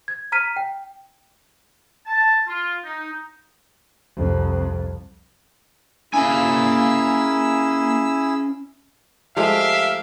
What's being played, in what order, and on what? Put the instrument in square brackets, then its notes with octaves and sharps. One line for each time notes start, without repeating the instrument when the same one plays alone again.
[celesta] G#6
A#5 F6 B6 D#7
G5
[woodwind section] A5
F4
D#4
[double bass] C2 F2
[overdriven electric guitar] A#3 G#5 [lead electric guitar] C#4 F5 [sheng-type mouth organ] E4 G#4 E6
[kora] F3 G#3 A3 [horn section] G4 A#4 F5 [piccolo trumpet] E5